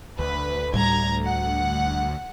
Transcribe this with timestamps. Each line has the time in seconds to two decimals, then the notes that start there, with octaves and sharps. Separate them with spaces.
0.19 D2 D3 B4
0.74 A2 G3 A#5 G#6
1.23 F#5